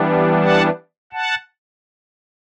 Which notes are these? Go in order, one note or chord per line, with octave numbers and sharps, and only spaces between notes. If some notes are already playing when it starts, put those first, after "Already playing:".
Already playing: E3 G3 B3 D4
F#5 A5
F#5 A5